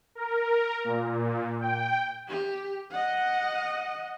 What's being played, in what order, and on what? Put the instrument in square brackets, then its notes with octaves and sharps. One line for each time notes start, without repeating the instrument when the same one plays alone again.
[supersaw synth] A#4
A#2
G5
[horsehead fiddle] G4
D#5 F#5